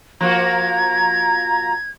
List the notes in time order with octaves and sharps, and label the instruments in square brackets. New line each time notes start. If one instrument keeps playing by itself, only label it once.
[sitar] F3 A#3 F#4 [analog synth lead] A#5 [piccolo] G#6